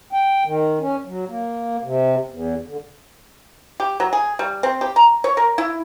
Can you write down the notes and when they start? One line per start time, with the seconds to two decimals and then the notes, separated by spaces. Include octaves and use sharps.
0.13 G5
0.45 D#3
0.80 C#4
1.05 F#3
1.28 A#3
1.83 C3
2.30 E2
2.66 D3
3.80 G4
4.00 F#3
4.13 G#4
4.39 G3
4.63 C4
4.81 G4
4.96 A#5
5.24 C#5
5.37 A#4
5.58 E4